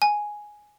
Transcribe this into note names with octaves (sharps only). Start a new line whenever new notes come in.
G#5